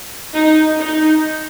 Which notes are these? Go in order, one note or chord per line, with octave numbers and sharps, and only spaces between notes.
D#4
D#4